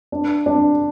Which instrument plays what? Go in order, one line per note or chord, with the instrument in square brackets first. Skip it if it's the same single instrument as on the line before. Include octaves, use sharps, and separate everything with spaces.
[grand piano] D4
D4